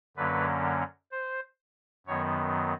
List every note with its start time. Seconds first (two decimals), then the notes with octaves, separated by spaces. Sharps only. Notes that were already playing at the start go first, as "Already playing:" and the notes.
0.17 F#2 D3 F#3 A#3 C#4 B4
1.12 C5
2.06 F#2 D#3 F#3 B3 C#5